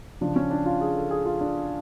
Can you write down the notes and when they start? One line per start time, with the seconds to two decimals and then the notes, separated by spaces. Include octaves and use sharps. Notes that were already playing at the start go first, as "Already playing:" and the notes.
0.21 C#3 F3 D4
0.36 C#4
0.51 D4
0.66 F4
0.81 G#4
0.96 A4
1.11 G#4
1.26 F4
1.41 D4